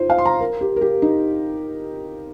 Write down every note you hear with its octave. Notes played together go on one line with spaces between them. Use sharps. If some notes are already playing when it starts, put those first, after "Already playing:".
Already playing: D#4 F4 C5
F5
C6
A#5
A#4
G4
A#4
G4
D#4